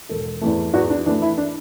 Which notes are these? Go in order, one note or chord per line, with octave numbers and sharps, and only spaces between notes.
E1 A4
E2 E3 A3
E2 F#4
D4
E3 A3 D4
E4
D4